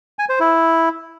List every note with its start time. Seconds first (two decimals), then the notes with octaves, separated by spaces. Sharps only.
0.19 G#5
0.29 C5
0.40 E4